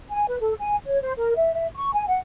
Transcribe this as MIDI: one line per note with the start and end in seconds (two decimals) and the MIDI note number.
0.11 0.25 80
0.28 0.36 71
0.40 0.53 69
0.60 0.76 80
0.86 1.00 73
1.01 1.12 72
1.17 1.33 70
1.36 1.51 76
1.54 1.67 76
1.74 1.92 85
1.93 2.06 80
2.08 2.19 78